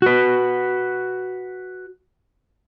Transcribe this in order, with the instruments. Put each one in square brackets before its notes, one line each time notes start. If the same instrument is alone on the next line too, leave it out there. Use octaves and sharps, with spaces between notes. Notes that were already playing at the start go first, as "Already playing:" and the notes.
[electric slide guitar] F#4 B4